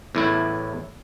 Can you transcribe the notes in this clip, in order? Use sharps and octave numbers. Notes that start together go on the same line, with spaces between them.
E2 A2 E4